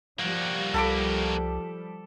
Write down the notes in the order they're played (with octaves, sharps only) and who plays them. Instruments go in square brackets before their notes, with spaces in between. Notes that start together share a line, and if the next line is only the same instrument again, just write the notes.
[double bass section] F3 G3 [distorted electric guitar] A#3 F#4
[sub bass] C2 [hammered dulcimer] A4 B5 D6